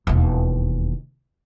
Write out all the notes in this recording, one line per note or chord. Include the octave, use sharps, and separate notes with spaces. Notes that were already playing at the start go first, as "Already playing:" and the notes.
E1 D#2